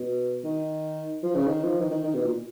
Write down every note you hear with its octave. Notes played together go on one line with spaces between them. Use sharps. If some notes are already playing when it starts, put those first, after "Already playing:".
Already playing: B2
D#3
F3
C#3
D#3
F3
D#3
D#3
D#3
B2
A#2